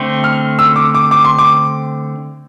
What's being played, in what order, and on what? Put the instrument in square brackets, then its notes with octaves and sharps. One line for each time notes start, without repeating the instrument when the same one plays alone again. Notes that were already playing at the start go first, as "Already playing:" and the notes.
Already playing: [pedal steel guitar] D3 A3 C4
[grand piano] F6
E6
D6
D6
D6
C6
D6